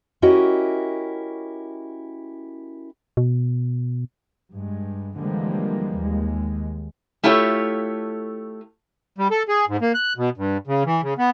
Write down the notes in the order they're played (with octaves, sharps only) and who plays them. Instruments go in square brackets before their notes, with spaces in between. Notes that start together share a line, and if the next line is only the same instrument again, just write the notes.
[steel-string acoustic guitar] C#4 E4 F#4 G4 A#4 D#5
[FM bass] B2
[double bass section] G2 G#3
D3 E3 F3 G3 G#3 A#3
D#2 G#3
[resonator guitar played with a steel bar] A3 E4 F4 G4 A4 C#5
[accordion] G3
A4
G#4
G#2
A#3
F#6
B2
G2
C#3
E3
C#3
B3